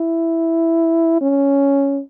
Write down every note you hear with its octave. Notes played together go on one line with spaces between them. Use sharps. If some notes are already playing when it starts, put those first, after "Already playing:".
Already playing: E4
C#4